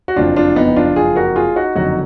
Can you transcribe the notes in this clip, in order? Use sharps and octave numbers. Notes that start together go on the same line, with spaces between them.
F#4
F#1 F2 F3 D4 F4
D4 F4
B3 D#4
D4 F4
F4 G#4
F#4 A#4
F4 G#4
D#4 F#4
F#1 F2 D3 F#3 D#4 F#4